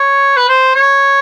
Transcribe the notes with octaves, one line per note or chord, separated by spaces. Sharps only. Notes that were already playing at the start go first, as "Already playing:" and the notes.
Already playing: C#5
B4
C5
C#5